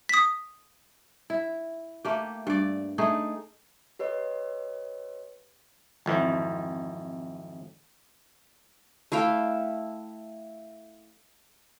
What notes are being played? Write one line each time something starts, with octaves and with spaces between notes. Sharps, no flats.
D#6 B6
E4
A3 A#3 G4
G2 D5
A3 D#4 G#4
G4 B4 C#5 D#5
G#1 F2 E3
A3 E4 F5 G5